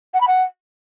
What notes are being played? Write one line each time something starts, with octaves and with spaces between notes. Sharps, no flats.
F#5
B5
F#5